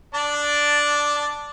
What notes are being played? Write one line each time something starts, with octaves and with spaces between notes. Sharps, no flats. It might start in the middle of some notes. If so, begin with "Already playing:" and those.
D4 D5 A5